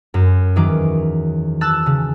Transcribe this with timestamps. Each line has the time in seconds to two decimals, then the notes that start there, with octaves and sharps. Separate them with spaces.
0.14 F#2
0.56 E2 D#3 F#3 D6
1.61 A5 E6 F#6 A6
1.86 C#3